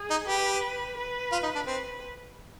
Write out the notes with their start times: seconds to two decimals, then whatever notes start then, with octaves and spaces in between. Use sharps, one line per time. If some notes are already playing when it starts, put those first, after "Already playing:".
Already playing: G#4
0.10 D#4
0.27 G4 B4
0.97 B4
1.32 F4
1.43 D#4
1.55 D4
1.66 C4 B4